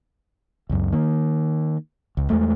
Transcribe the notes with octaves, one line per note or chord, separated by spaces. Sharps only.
C#2 F#2
D#3 A#3
C#2
E2 G#3 A3